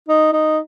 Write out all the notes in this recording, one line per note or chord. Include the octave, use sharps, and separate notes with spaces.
D#4
D#4